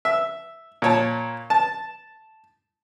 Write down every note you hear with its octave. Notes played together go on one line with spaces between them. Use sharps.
E5
A#2 C#5 A5
A5